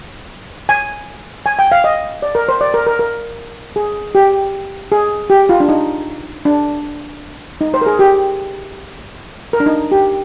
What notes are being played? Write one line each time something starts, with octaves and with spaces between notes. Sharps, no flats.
G#5
G#5
G5
F5
D#5
D5
A#4
C5
D5
A#4
A#4
A#4
G#4
G4
G#4
G4
F4
D4
D#4
D4
D#4
C5
A#4
G#4
G4
A#4
D4
D#4
G4